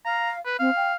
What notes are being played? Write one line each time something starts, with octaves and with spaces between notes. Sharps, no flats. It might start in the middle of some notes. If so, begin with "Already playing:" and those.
F5 A#5
B4
C4 F5
G5